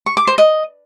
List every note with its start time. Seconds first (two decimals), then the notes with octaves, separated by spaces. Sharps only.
0.06 C#6
0.17 D6
0.27 C5
0.38 D#5